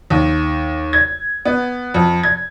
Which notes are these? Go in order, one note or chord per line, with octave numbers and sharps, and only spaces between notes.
D#2
G#6
B3
F2
G#6